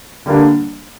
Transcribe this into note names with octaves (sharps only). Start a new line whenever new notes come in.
D3 G3 A#3 D4